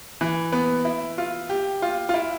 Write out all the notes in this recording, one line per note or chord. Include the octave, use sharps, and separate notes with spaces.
E3
B3
E4
F4
G4
F4
F4
E4